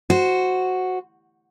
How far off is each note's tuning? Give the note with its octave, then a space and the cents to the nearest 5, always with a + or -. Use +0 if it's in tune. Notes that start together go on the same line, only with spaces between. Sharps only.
F#4 +0 C5 +0